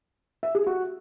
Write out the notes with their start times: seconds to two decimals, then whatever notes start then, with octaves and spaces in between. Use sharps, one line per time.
0.43 E5
0.55 G#4
0.67 F#4